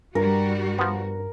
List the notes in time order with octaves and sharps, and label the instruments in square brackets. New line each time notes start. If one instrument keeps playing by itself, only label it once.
[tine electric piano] G2 [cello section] G3 F#4 [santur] A#4
[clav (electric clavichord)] F3 B3